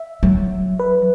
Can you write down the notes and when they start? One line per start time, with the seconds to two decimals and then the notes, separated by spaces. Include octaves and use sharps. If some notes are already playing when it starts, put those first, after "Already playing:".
Already playing: E5
0.23 F#3
0.79 B4